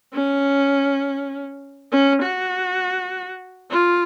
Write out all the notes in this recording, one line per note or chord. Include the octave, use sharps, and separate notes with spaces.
C#4
C#4
F#4
F4